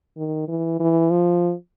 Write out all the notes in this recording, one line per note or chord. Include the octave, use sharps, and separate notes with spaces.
D#3
E3
E3
F3